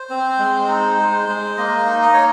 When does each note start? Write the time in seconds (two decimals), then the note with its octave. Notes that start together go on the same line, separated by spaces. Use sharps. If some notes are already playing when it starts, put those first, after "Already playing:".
Already playing: C5
0.10 C4
0.39 G#3
0.68 D#4
0.98 G#3
1.29 G#3
1.57 A#3 D#5
1.87 D#4
2.02 D#5
2.13 A#3 C#5